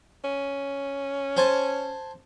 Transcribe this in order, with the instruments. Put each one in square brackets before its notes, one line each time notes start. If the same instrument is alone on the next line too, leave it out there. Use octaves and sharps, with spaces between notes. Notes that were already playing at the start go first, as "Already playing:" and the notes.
[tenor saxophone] C#4
[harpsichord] C5 G#5 A5